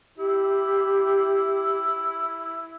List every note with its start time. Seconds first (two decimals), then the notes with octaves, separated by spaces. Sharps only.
0.18 E4 G4